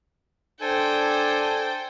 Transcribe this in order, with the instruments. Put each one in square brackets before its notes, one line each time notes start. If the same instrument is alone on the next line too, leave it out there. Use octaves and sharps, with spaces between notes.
[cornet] D4 [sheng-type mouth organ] A4 G#5 [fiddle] C5 G5